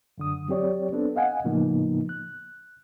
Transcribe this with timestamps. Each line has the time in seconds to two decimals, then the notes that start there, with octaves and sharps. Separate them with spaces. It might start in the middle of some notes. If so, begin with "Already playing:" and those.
0.18 F#2 D3 D#6
0.48 F#3 C4 G4 C#5 D5
0.92 B3 C4 D4 A4
1.16 D#5 F5 F#5 G#5
1.44 A2 C#3 F3 A#3 B3 D#4
2.09 F#6